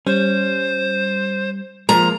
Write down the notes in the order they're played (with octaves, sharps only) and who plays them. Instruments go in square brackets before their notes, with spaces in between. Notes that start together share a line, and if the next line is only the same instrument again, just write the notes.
[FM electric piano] G3 [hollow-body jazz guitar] C#4 [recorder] C5
[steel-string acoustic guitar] F3 A#5 [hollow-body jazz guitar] G#3 A#3